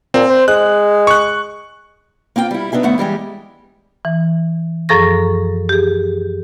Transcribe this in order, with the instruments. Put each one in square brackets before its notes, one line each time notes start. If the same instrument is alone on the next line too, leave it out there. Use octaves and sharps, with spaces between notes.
[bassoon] A#2 [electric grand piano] C4
[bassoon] C5
[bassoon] G#3 [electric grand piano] F#6
[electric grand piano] C#6 F#6
[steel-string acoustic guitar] A#3 C4 F4 G5
G3 E4
B3 D4 D#4 G#4 E5
F#2 D3 A3 B3 E5 F#5
E3 G3 G#3 G4
[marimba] E3
F#2 F3 G#4 A4 C#6 A#6
G4 G#4